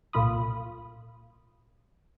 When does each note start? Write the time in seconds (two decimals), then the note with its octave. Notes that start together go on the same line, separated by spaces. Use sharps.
0.13 C2 A#2 A#3 F4 B5 D#6